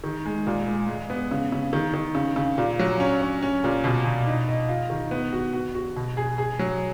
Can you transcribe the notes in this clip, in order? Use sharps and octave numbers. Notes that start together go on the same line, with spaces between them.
D#3
G#3
A#2
G#3
G#3
B3
C#3
C#3
D#3
D#3
C#3
C#3
A#2
F#3
C#4
C#4
C#4
A#2
B2
B2
D#4
D#5
F4
D#3
B3
F#4
F#4
F#4
B2
G#4
G#4
F#3